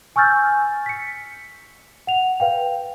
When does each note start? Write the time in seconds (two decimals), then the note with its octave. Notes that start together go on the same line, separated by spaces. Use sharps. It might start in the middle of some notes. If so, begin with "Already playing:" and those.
0.16 G#5 C#6 E6 F6 G6 A6
0.86 B6 C#7
2.07 F#5 F7
2.40 B4 F5 G5